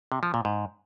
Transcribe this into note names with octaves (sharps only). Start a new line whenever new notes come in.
C3
F3
A#2
G#2